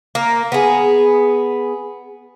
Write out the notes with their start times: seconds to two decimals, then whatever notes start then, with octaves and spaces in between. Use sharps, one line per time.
0.15 A#3
0.52 B3 G#4